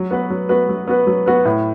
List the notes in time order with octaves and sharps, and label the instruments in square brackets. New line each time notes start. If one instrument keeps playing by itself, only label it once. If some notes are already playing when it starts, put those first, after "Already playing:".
Already playing: [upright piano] F#3
B3 F#4 B4
F#3
B3 F#4 B4
F#3
B3 F#4 B4
F#3
B3 F#4 B4
A2